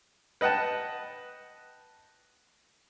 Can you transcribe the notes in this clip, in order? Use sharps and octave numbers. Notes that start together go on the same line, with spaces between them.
B4 D#5 F#5 G5 A5